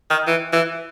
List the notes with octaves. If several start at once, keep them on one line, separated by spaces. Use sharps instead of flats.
D#3
E3
E3